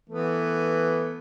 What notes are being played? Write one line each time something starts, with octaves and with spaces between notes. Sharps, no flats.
E3 A3 B3